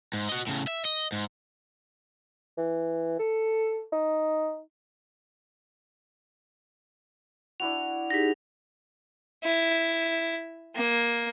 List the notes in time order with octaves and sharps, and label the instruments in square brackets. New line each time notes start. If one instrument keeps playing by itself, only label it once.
[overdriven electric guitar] G#2
F#4 D#5
A2 C#3
E5
D#5
G#2
[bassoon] E3
A4
D#4
[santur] D4 E4 F#4 [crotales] F7
[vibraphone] D#4 G4 G#4 [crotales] A#6 B6
[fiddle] E4
A#3